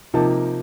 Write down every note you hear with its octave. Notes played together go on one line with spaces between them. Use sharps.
C3 F3 A#3 D#4 A5